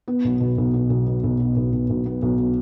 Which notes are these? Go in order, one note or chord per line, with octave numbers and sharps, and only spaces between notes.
B3
B1
B2
B1
B3
B1
B2
B1
B3
B1
B2
B1
B3
B1
B2